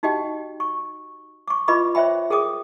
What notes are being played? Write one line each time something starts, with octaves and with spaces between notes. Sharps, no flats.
D#4 F#4 G4 D#5 G5
C#6
C#6 D6
F4 B4 D#5 B5 C#6 D6
C5 C#5 E5 G5 B5
G#4 A#4 G5 D6 D#6